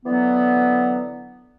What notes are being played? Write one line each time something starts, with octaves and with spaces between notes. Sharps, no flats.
D3 E3 F#3 B3